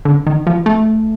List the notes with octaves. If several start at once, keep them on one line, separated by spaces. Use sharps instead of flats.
D3
D#3
F3
A3